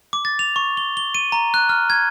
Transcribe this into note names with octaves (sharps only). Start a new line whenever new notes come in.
D6
A6
F7
C#6
G7
G7
D#7
A#5
F#6
F6
G#6